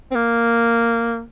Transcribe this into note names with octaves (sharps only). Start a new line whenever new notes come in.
C4
A#3